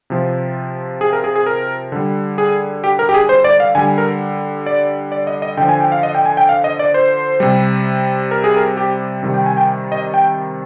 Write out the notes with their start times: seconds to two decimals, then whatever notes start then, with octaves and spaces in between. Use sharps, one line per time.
0.10 C3 F3
1.01 G#4
1.13 A#4
1.24 G#4
1.36 G#4
1.46 A#4
1.92 D3 G3
2.38 G#4
2.84 G4
2.99 A#4
3.09 G4
3.14 G#4
3.29 C5
3.44 D5
3.60 F5
3.75 D3 G3 G#5
3.98 A#4
4.66 D5
5.12 D5
5.27 D#5
5.42 D#5
5.57 D3 F3 G5
5.69 G#5
5.80 G5
5.92 F5
6.03 D#5
6.15 G5
6.26 G#5
6.37 G5
6.49 F5
6.64 D#5
6.79 D5
6.94 C5
7.40 C3 G3
8.31 A#4
8.44 G#4
8.57 A#4
8.77 G4
9.23 C3 D#3 G3
9.34 G5
9.46 G#5
9.57 G5
9.92 D#5
10.14 G5